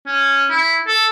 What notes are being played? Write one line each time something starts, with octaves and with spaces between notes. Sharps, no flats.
C#4
E4
A4